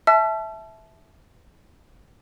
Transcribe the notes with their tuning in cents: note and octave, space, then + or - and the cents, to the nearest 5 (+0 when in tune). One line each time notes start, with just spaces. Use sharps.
E5 -10 A5 -25 E6 +45